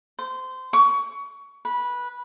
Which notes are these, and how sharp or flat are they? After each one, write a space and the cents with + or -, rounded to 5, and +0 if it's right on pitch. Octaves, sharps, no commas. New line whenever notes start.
C5 -20
C#6 +20
B4 -15